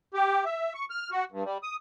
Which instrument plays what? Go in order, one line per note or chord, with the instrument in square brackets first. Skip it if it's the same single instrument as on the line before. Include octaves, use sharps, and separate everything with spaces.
[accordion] G4
E5
C#6
F6
F#4
G2
G3
D#6